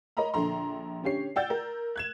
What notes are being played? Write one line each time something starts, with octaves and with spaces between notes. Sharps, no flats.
A#4 C#5 D#5 A#5 B5
A#1 D3 A4 A#5 C6
D3 C#4 G4 C#5 C7
D5 F#5 G5 E6 G6 A6
A#4
F#6 G#6 E7